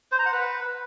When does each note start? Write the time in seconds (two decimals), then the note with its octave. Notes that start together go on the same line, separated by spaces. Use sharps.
0.12 C5
0.19 A#5
0.26 F#5
0.32 B4